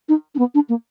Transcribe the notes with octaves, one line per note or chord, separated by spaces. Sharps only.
D#4
D4
B3
D4
A#3